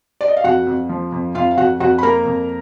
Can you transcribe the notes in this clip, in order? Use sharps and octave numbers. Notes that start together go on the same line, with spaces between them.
D5
D#5
F5
F2 F#4 F#5
F2
F3
F2
F2 F4 F5
F5
F2 F#4 F#5
F2 F#4 F#5
B5
A#3 A#4 A#5
F2